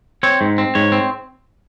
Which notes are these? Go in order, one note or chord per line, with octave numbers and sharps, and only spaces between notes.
C4 C#5
G#2
C4
G#2 C#5
C4